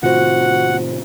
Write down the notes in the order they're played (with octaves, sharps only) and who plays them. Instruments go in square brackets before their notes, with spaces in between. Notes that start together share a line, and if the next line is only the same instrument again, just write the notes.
[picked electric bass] A2 C3 D#3 [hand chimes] F4 C5 [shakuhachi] F#4 [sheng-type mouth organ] F#5